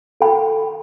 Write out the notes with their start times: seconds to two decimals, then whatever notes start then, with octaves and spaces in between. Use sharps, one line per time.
0.21 A4 G5 B5